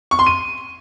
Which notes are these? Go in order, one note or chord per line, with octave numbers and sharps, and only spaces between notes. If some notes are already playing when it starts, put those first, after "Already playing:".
C#6
C6
D#7